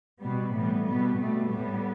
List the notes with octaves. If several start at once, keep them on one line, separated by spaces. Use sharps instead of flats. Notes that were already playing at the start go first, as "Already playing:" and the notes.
B2 G3 B3
A2 E3 G3 B3
B2 G3 B3
B2 G3 A3
A2 G3 B3